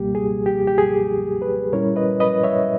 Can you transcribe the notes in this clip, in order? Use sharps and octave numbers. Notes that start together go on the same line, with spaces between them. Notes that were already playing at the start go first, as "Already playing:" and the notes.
Already playing: C#2 B2 G3 A#3 G4
G#4
G4
G4
G#4
G#4 B4
A#2 G3 C#4 E4 A#4 C#5
B4 D#5
B4 D#5
C#5 E5